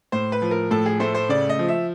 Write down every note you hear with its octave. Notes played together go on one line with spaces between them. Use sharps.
A2 C5
B4
F3
A#4
A2 A4
G#4
A3 C5
C5
C#3 D5
D#5
F3
E5